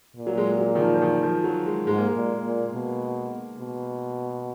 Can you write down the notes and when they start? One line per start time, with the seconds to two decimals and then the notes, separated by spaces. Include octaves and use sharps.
0.16 A#2
0.27 F#3
0.38 G#3
0.51 G#3
0.58 F#3
0.75 D#3
0.80 F3
0.96 F3
1.02 D#3
1.23 F3
1.44 F#3
1.66 G#3
1.87 G#2 G#3
1.98 A#3
2.07 G#3
2.16 A#2
2.44 A#2
2.72 B2
3.58 B2